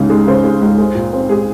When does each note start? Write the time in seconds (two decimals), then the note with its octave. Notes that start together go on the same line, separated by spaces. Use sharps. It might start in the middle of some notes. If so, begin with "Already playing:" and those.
Already playing: C#2 G#2 C#3
0.10 G#3
0.27 C#3 C5
0.44 G#3
0.61 C#2
0.78 G#3
0.95 A#2
1.13 C4
1.29 G#3 G#4